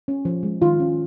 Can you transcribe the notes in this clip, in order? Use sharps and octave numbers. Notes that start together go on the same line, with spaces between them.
C#4
F3
G#3
D#3 F4
C#4